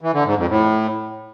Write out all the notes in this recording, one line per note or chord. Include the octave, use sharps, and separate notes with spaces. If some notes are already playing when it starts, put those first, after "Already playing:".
E3
D3
G#2
F2
A2